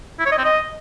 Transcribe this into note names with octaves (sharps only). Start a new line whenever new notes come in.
E4
C#5
D#5
C4
D#5